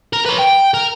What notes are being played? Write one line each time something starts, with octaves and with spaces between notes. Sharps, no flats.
A#4
B4 C#5
G5
A#4